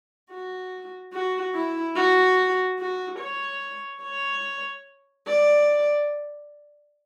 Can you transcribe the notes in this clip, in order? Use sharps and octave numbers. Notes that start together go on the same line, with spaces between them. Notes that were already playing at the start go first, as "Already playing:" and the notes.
F#4
F#4
E4
F#4
F#4
C#5
C#5
D5